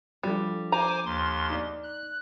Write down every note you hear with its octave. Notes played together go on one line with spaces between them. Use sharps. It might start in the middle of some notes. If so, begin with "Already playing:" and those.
F3 G3 D4 A4
C5 G#5 A#5 D6
D#2 C6
D#4 D5
F#6